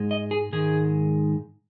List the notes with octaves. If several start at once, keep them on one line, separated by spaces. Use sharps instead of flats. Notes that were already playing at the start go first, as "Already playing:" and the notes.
Already playing: G#2 G#3
D#5
G#4
G#2 D#3 G#3 G#4